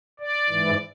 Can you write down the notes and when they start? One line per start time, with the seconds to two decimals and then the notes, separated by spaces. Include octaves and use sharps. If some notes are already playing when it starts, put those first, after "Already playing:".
0.20 D5
0.49 G#2 E3